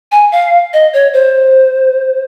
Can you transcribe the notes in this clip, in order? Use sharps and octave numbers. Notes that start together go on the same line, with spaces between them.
G#5
F5
D#5
C#5
C5